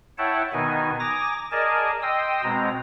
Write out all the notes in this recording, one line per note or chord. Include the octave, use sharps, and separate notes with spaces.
E4 C#5 E5 F#5 G5 A5
B2 D#3 B3 D#4 G#5
G#5 A#5 D6 D#6 A#6
G#4 A#4 D5 D#5 G#5 A5
D#5 G5 C6 D#6 E6
B2 G#3 C4 A#5